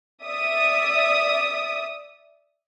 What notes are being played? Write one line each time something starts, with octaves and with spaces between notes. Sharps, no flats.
D5 E5 D#6